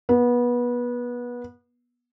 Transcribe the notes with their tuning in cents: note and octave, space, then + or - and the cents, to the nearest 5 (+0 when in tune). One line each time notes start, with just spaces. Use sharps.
B3 -25